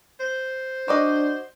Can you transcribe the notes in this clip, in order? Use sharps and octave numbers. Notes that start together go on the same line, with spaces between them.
C5
D4 F#4 D5 D#5